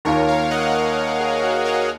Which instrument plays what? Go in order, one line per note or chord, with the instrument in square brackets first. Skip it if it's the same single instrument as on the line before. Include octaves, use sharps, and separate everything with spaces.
[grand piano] D#2 D#3 A#3 F4 [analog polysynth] A#4 C#5
[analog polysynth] C#5 F5
D#5 F#5
D#5 F#5
G#4
F#4 A#4
A#4 C#5
A#4